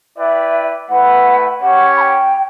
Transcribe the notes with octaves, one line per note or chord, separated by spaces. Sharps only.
E4 B4 D5 E5 G5
A3 E4 B4 F#5
C#4 G4 C#5 F#5
B5
G5